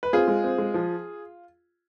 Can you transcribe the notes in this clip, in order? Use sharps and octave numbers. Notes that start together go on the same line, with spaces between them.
B4
C4 F4 G#4
G#3
C4
G#3
F3